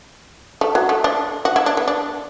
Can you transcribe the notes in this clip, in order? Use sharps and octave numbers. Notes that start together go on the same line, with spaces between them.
A3
F#3
A3
D4
F#4
E4
D4
B3
D4